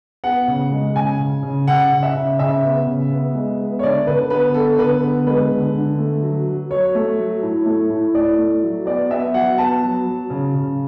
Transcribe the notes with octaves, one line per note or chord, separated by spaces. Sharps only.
B3 F#5
C#3
G#3
C#3 G#5
C#3
C#3
C#3 F#5
C#3
E5
C#3
C#3 E5
B3
C#3
B3
G#3
B3
C#5
D3 D5
D3 B4
B3 B4
B3 A4
D3 B4
B3
G#3 B4
D3
D3
A3
F#3
F#3
F#3 C#5
A3
F#3
A2
A3
A2
A2 D5
A3
F#3
B3 D5
B3 E5
F#3 F#5
B3 A5
F#3
F#3
C#3
C#3